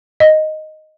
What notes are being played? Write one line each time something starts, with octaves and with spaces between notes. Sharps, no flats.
D#5